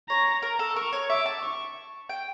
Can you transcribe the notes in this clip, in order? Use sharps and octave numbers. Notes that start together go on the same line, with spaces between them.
C#5 A#5
A#4
A4
A#4 C#6
C#5
E5 D6
A5
C#6
G5